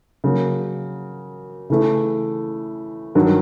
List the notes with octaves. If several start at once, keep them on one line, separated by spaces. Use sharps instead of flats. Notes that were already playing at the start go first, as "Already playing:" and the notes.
C#3 F#3 A#3
C#3 E3 A3
G2 D#3 F#3